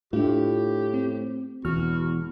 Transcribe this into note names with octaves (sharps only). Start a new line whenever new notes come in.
A2 D4 F4 G4
C4
E1 E2 F#4 F6